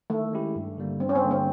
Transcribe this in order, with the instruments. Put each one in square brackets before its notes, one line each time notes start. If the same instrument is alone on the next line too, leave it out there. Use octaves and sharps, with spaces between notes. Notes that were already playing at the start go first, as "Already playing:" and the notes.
[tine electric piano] D#3 [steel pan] A3
[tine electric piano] G#3 C#4 E4 G4
G2
D3 G3 A#3
[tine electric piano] G2 [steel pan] C4
[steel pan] C#4
C4
[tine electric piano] D3 G3 A#3
[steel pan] C4